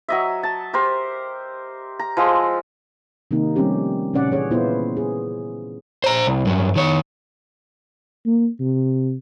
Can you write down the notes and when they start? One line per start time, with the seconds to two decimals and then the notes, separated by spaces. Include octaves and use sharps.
0.08 F#3 D#5 E5
0.43 A5
0.73 G4 A#4 C5
1.99 A#5
2.17 F3 G#3 E6
3.31 C3 D#3 A#3 D#4
3.56 F3 G3 A3 C4 C#4 G4
4.14 A#2 C#3 C#4 D5 F#5
4.31 E3 G#4 C#5
4.50 A#2 B3 E4 F4 C5
4.97 G#4
6.04 C5 A#5
6.27 C2
6.46 G2 F#3
6.76 D#3 C#5
8.26 A#3
8.60 C3